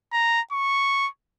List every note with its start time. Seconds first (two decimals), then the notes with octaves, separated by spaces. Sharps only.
0.13 A#5
0.52 C#6